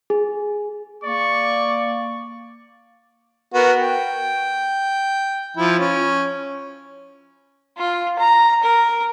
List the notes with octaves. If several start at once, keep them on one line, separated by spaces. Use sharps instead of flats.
G#4
A#3 D5 C#6
B3 F#4 A#4
G5
F3 E4
C#4
F4
A#5
A#4